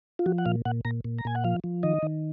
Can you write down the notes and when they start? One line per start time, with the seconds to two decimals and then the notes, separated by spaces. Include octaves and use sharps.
0.19 F4
0.26 F3 F#4
0.38 F#5
0.46 A#2 F5
0.65 A#2 F#5
0.85 A#2 A#5
1.05 A#2
1.19 A#5
1.25 A#2 G#5
1.35 F#5
1.44 F3 F5
1.64 F3
1.83 D#3 D#5
2.02 D#3